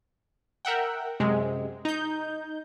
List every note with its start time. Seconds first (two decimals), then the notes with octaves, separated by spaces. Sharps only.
0.65 A#4 E5 F#5 G5
1.20 F#2 C3 G#3
1.85 D#4 G6